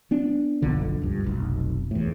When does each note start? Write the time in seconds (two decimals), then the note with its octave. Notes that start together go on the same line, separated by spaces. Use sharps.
0.11 B3 D4
0.62 F#1 B1 D3 F3
1.02 C#2 G2
1.24 F1 B1
1.91 E2 A2